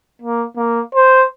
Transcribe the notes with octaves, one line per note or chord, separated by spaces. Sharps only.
A#3
A#3
C5